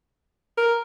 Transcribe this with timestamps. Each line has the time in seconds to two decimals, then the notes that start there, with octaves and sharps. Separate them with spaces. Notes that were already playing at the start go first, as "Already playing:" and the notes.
0.57 A#4